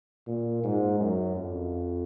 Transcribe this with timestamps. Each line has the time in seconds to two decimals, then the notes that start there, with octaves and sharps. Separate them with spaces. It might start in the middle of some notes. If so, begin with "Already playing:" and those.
0.27 A#2
0.64 G#2
1.00 F#2
1.36 F2